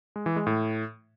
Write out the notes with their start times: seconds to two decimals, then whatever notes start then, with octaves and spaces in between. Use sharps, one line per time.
0.16 G#3
0.26 E3
0.36 G#3
0.47 A2